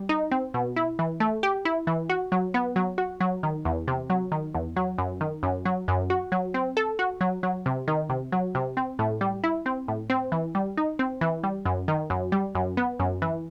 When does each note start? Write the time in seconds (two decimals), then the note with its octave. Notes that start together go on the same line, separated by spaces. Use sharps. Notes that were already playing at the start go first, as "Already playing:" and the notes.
Already playing: G3
0.09 D#4
0.31 C4
0.54 B2
0.76 E4
0.99 E3
1.20 A3
1.43 G4
1.65 E4
1.87 E3
2.10 F#4
2.32 F#3
2.54 B3
2.76 F#3
2.98 F#4
3.21 F#3
3.43 D#3
3.65 E2
3.88 C3
4.10 F#3
4.32 D#3
4.54 E2
4.76 F#3
4.98 F#2
5.21 D#3
5.43 F#2
5.65 F#3
5.88 F#2
6.10 F#4
6.32 F#3
6.54 C4
6.77 A4
6.99 F#4
7.21 F#3
7.43 F#3
7.66 C3
7.88 D#3
8.10 C3
8.32 F#3
8.55 C3
8.77 C4
8.99 A2
9.21 G3
9.44 E4
9.66 C4
9.88 A2
10.10 C4
10.32 E3
10.55 G3
10.77 D#4
10.99 C4
11.21 E3
11.44 G3
11.65 F#2
11.88 D#3
12.10 F#2
12.32 G3
12.55 F#2
12.77 B3
12.99 F#2
13.22 E3